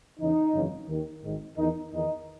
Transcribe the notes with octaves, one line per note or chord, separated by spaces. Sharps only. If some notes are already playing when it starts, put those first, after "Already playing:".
E2 C#3 E3 D#4
G#1 F#2 C#3 E3
D#2 D#3
G#1 G#2 D#3
E2 D#3 D#4
E2 D#3 D#4